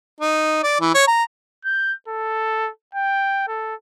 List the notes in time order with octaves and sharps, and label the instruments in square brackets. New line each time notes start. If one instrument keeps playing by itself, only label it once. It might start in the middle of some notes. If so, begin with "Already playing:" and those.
[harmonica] D#4
D5
E3
C#5
A#5
[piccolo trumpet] G6
A4
G5
A4